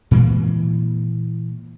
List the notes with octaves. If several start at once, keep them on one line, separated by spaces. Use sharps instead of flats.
A#2 E3 G#3 A#3